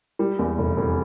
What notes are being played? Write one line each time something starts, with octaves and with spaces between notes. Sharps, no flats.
G3
E2
F1
F1